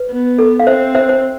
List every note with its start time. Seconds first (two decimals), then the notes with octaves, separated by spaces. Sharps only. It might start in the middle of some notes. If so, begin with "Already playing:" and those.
Already playing: B4
0.10 B3
0.39 A4
0.60 F5
0.67 C4 C5 E5
0.95 C5 E5
1.09 C5